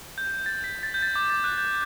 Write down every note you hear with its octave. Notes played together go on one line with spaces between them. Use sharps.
G6
A6
B6
A6
G6
A6
D6
A6
F#6
G6